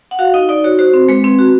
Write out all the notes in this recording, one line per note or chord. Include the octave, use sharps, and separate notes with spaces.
F#5
F#4 F5
D#4 D#5
D#4 D5
F#4 C#5
F#4 C5
C4
G#3 B4
C4
F#4